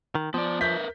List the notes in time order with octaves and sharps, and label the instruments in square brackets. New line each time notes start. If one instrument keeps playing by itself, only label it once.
[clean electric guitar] D#3
[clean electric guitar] F3 [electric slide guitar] B3 D5
[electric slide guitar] A#4 B4 E5 [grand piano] G6 B6